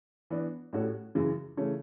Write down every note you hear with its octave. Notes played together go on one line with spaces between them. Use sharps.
E3 B3 D4
A2 G3 C#4 F#4 A4
F#2 C#3 E3
C#3 E3 A3 C#4